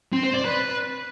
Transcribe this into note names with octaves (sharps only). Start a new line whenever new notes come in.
C4
C5
D5
B4